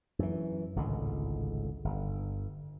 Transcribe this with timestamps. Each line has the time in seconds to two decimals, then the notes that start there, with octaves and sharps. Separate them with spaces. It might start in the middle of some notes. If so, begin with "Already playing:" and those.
0.19 F#2 E3
0.76 G#1 C#2 A2 D3
1.84 G1